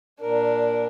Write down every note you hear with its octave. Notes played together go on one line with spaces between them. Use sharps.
A#2 D4 A#4